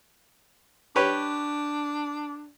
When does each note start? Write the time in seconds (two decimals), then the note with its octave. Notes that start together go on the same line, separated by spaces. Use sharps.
0.96 D4 G4 B4 C#5